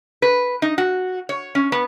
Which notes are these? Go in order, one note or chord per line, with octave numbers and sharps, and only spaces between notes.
B4
D#4
F#4
C#5
C#4
B3